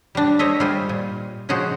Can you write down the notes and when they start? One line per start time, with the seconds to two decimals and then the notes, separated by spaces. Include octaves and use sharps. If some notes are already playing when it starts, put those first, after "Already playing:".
0.15 G3 D4
0.39 C5 C#5 D#5 E5
0.60 G3 F4 C5 G#5
0.89 A#2
1.49 C#3 F3 G#3 F#4 G#4 C5